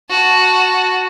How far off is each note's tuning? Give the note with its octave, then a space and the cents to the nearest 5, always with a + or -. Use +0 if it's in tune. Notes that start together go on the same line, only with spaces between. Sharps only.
F#4 +0 A5 +0